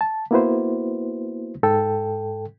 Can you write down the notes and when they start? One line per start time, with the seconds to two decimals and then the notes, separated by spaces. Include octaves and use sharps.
0.01 A5
0.31 A#3 B3 E4 F#4 B4 C5
1.63 G#2 A4 G5